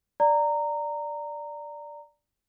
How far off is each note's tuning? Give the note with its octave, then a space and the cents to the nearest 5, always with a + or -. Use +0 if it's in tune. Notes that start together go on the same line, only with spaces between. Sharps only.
D5 +0 A#5 -15